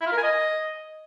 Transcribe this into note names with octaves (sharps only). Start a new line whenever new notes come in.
E4
F4
A#4
G#5
D#5